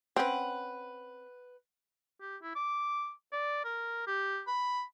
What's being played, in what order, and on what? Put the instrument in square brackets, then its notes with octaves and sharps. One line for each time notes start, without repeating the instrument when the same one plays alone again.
[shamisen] C4 C#4 [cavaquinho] B4 F#5
[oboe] G4
E4
D6
D5
A#4
G4
B5